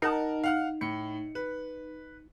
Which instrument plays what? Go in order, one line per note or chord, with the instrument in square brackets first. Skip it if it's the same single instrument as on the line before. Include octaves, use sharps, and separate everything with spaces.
[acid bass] D#4 [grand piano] A#4 F#5 A5
[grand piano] F5 F#5 F6
A2 C#7
B4